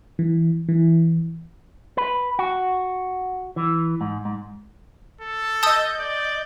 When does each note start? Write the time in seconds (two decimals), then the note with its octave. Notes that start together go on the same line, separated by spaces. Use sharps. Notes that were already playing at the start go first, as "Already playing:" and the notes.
0.19 E3
0.69 E3
1.97 B4
2.39 F#4
3.56 E3
4.01 G#2
4.25 G#2
5.21 A4
5.63 D#5 A5 D#6 E6 G6
5.99 D5